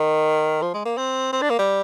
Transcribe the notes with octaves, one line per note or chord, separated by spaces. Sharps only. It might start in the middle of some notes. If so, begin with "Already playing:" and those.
Already playing: D#3
F3
G#3
A#3
C4
C4
D4
A#3
G3